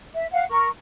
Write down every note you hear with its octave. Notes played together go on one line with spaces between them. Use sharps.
E5
F5 F#5
A#4 C#6